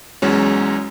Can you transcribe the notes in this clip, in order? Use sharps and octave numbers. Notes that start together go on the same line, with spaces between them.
E2 F#3 G#3 C#4